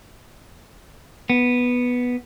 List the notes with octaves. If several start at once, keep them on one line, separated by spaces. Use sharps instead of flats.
B3